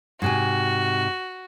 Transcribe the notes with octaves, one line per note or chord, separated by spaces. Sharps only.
G#2 C3 F#4 G#5